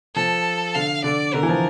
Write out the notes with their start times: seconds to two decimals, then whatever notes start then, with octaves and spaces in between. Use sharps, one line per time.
0.15 F3 A4
0.75 D3 F5
1.04 D3 D5
1.34 D3 A#4
1.43 E3
1.49 F3